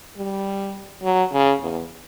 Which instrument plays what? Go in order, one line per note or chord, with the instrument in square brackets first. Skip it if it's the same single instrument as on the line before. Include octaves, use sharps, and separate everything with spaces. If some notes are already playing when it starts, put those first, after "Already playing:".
[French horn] G3
F#3
C#3
E2